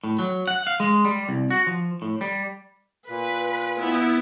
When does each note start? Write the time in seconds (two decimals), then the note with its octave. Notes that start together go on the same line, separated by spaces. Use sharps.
0.04 A2
0.19 F#3
0.47 F#5
0.67 F5
0.80 G#3
1.05 G3
1.29 C2
1.50 F#4
1.67 F3
2.02 A2
2.21 G3
3.09 A#2 B4
3.81 B3 E4